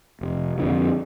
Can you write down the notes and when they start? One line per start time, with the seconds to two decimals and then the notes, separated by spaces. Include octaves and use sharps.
0.21 F1
0.58 F2 D3 F3